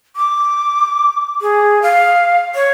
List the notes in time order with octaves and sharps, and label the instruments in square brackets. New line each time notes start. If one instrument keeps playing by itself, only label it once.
[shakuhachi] D6
G#4
F5
C#5